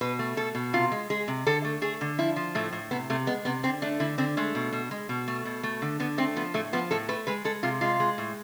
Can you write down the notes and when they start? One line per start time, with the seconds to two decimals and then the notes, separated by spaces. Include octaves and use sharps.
0.01 B2 B4
0.19 A3
0.37 B2 A4
0.55 B2
0.73 C3 F4
0.92 G#3
1.10 G#3 G#4
1.28 C3
1.46 D3 A4
1.65 A3
1.82 A3 G#4
2.01 D3
2.19 F3 E4
2.36 F3
2.55 A2 A3
2.73 A2
2.91 C3 B3
3.10 C3 A3
3.27 G#3 B3
3.45 C3 B3
3.63 D3 C4
3.82 A3 D4
4.00 D3 E4
4.18 D3 C4
4.37 G#3 A3
4.55 B2
4.73 B2
4.91 G#3
5.09 B2
5.28 A3
5.45 B2
5.63 A3
5.82 D3
6.00 D3 B3
6.18 A3 C4
6.36 F3 B3
6.54 A2 A3
6.73 F3 B3
6.91 A2 A4
7.09 A3 B4
7.27 G#3 B4
7.45 G#3 A4
7.63 C3 F4
7.81 G#3 F4
8.00 G#3
8.18 A2